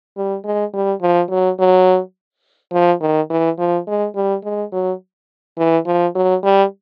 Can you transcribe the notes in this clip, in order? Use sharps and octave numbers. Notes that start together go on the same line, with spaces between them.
G3
G#3
G3
F3
F#3
F#3
F3
D#3
E3
F3
G#3
G3
G#3
F#3
E3
F3
F#3
G3